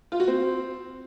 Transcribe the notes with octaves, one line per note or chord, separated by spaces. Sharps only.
F4
F#4
C4